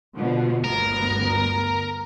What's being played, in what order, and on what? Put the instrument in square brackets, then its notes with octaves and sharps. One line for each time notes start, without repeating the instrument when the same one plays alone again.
[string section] B2 D3 F3
[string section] G1 D2 B3 [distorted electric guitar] A#4